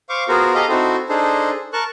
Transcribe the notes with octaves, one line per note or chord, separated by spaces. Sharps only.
C5 F5 C#6 D6
B3 F4 F#4 G#4 A#4 C5
G4 A4 D#5 F5 A#5
C4 D#4 E4 F#4 A4 C5
D4 D#4 G#4 A4 C5
A#4 A5 C#6 F#6